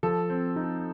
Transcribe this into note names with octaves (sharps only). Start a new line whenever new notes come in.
F3 A4
C4
D#4